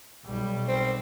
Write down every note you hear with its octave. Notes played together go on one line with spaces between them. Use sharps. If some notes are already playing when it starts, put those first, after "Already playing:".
B1 G3
C4